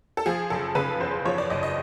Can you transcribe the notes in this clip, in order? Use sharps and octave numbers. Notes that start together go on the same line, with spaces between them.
A4
F3 G#4
F#1 A4
C#3 B4
E2 C5
F3 C#5
D5
F#1 D#5
D#5